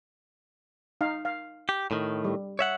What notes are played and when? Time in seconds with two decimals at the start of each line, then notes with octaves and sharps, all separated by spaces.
1.01 D#4 F5
1.25 F5
1.69 G4
1.91 A2 D#3
2.25 G3
2.59 C#5 E5 F#5